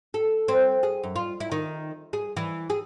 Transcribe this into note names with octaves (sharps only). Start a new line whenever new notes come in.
A4
C4
G#4
F#2
F4
E4
D#3
G#4
E3
G#4